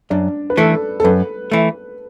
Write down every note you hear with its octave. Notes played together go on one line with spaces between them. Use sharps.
F#2 D4 D5
B4
E3 A3 A4
A4
F#2 B4
E3 A3